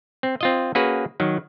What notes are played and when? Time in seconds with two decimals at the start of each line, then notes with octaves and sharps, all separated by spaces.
0.23 C4
0.41 C4 F4 D#5
0.75 A#3 C#4 F#4 G#4 B4
1.20 D#3 F#3